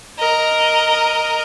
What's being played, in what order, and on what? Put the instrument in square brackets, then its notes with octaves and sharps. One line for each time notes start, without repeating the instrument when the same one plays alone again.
[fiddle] A#4 D#5